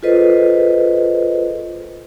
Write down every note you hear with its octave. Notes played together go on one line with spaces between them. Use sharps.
F4 G#4 A4 B4 C5 D#5